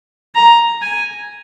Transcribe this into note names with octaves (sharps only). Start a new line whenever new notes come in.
A#5
G#5